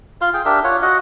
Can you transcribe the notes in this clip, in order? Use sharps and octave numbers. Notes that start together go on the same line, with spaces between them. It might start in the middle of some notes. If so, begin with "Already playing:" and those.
F4 F5 C6
G#4 G5
D4 G4 A#4 E5
F4 C#5 F#5
F#4 D#5 F#5